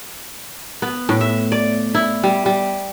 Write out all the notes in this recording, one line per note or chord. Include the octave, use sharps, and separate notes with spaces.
B3
A2
E5
D5
E4
G3
G3